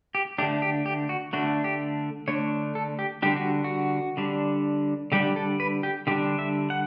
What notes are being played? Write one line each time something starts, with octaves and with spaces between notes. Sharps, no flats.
G4
D3 A3 D4 G4
G4
G4
F#4
D3 A3 D4 F#4
G4
D3 A3 D4 C#5
A4
G4
D3 G3 D4 G4
F#4
F#4
D3 G3 D4
D3 G3 D4 G4
A4
B4
G4
D3 G3 D4 G4
E5
F#5